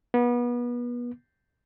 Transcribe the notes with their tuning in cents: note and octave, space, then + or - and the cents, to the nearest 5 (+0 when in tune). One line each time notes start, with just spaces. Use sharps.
B3 -30